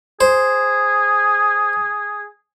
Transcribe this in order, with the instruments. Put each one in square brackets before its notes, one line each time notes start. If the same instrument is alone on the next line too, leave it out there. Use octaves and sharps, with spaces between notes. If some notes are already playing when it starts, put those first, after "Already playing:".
[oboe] G#4 [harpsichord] C5